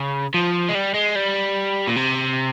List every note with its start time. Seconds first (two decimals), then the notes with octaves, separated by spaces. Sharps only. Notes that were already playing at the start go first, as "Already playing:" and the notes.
Already playing: C#3
0.34 F3
0.69 G#3
0.75 G3
0.94 G#3
1.15 G3
1.88 A#2
1.96 C3